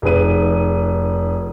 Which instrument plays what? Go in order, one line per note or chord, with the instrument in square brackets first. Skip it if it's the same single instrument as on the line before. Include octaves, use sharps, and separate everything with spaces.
[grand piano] F1 D#4 G#4 B4 D#7